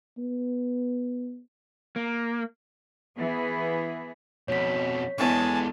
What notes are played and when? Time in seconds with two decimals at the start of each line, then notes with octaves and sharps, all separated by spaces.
0.18 B3
1.96 A#3
3.17 E3 B3 E4 G#4
4.48 F2 B2 C#5 B6
5.18 E2 D3 E3 G#3 G#5 A5 C#6